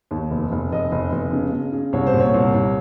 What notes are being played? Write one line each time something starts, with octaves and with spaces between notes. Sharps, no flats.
D#2
F1
F1
F1 D#5
F1
F1
C#3
C#3
C#3
C2 C#5
C5
A#2
C#5
C2
C2